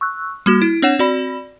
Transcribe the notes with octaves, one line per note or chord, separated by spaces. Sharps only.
C#6 E6 F#6
G3 A#3 F#4
E4
C4 D4 C#5 F#5 E7
C4 F#4 D5 B5